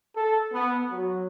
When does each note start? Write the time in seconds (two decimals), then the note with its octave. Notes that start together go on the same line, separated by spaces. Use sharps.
0.16 A4
0.53 B3
0.91 F#3